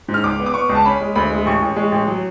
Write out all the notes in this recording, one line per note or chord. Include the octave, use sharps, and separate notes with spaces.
G#2
F6
C#2 D6
B3
D6
B3 C#6
C#2
A5
C#4 B5
G#3
D2 B5
G#3
A1 C#6
A1
G#3
A1
F#3